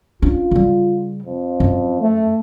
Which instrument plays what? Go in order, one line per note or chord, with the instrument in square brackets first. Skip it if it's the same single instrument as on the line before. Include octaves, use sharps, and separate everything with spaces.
[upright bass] C#4 D4 [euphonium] F4
[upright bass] C#3 G3
[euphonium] F2
[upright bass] F#2
[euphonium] A3